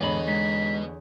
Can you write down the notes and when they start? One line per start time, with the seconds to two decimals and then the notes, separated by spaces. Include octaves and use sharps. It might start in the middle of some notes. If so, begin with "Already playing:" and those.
0.01 E2 G#2 D3 B3 B4 C#5 D#5 B5
0.27 G#3 D#4 B6